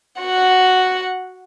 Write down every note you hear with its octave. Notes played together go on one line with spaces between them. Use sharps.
F#4 F#5